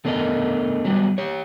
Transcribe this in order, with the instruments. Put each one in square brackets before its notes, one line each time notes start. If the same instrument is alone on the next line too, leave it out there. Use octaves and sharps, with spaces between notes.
[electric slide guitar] A3 B3 D4 A4 A#4 D#5
F#3 G3 B3
G4 C#5